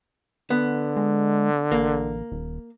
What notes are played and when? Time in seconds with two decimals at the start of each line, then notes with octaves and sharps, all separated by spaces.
0.50 D3 B3
0.97 G#3
1.71 A1 A#3
2.32 D#1